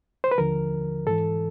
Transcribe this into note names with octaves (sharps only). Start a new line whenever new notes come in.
C5
B4
D#2 D3 F3 A#4
G#2 E3 A4